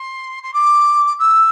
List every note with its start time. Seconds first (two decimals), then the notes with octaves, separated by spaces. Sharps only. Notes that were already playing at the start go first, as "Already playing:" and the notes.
Already playing: C6
0.42 C6
0.53 D6
1.19 E6